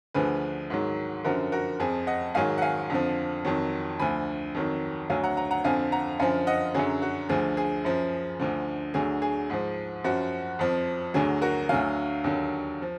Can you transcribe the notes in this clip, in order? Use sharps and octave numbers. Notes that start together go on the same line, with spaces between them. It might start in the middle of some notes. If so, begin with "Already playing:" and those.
D2 D3 F3 G#4 B4
G#2 D#3 F#3
F#2 D3 F3 F#4 A#4
F#4 A#4
F2 F3 G#4
D#5 F#5
G#2 D#3 F#3 F5 G#5
F#5
F5 G#5
F2 D3 F3
F2 D#3 F#3
D2 D3 F3 G#5 B5
F2 D#3 F#3
D2 D3 F#3 F5 G#5
F#5 A#5
F#5 A#5
F#5 A#5
F2 D3 F3 F5 G#5
F#5 A#5
F#2 D3 F3 F5 G#5
D#5 F#5
F#2 D3 F#3 G#4
F#4
D2 D3 F3 G#4
G#4
F#2 F3
D2 D3 F3
D2 D3 F#3 G#4
G#4
G#2 F3
F#2 F3 F#4
F2 F3
D2 D3 F#3 G#4
F#4 A#4
D2 D3 F#3 F5 G#5
D#2 D3 F#3
F3